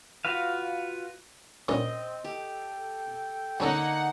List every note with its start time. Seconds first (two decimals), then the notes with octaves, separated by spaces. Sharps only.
0.25 F4 F#4 B4 F5
1.68 G2 A#2 C#3 C4 D#5
2.24 G4 A4 G5
3.60 D3 G3 A#3 C#4 D#4 A4 F#5 A#5